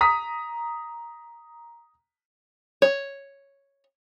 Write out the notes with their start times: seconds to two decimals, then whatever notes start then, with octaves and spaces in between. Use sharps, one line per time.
0.01 A#5 D#6 B6
2.82 C#5